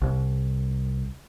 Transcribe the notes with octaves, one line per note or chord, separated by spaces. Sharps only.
C2